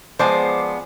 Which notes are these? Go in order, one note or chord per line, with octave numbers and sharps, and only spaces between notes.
F3 G#3 B3 C5 D5